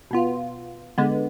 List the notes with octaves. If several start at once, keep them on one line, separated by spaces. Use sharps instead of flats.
B2 B3 F4
D3 G#3 B3